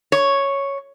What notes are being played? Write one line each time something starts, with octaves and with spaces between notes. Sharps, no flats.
C#5